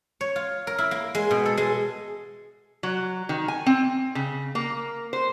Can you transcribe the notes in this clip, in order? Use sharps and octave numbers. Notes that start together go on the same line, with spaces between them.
C#5
F4
A#4
E4
A#3
G#3
B2
A4
G#3
F#3
D#3
G#5
C4
C#3
A#3
C5